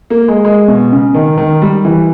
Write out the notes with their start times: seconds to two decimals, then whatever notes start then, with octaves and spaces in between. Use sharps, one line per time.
0.10 A#3
0.28 G#3
0.45 G#3
0.68 B2
0.92 C#3
1.14 D#3
1.38 D#3
1.62 G3
1.85 E3